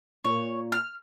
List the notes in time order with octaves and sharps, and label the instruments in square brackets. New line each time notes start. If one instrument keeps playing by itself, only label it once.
[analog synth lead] A#2 [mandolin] C#5
[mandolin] F6